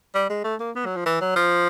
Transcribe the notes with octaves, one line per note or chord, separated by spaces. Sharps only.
G3
G#3
A3
A#3
B3
F#3
F3
E3
F#3
F3